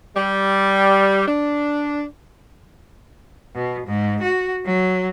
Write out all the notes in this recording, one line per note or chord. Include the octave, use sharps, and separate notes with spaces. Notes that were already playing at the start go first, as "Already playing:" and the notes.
G3
D4
B2
G#2
F#4
F#3